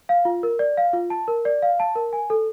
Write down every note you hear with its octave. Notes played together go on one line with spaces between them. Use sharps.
F5
F4
A#4
D5
F5
F4
A5
A#4
D5
F5
A5
A#4
G#5
A4